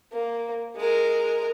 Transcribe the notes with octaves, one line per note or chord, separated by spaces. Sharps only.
A#3
G#3 A#4